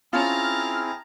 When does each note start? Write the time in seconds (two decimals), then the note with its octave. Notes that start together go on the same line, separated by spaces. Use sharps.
0.13 C4 C#4 E4 F4 G#4 A5 A#5 F6